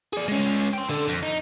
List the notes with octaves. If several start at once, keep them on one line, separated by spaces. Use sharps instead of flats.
G#4 D5
G#3 C#4
G5 C6
D3 A4
F2
D#4